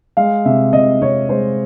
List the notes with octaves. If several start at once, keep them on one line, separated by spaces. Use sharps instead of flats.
G#3 F5
C3 E5
C3 D#5
C3 C#5
G#3 C5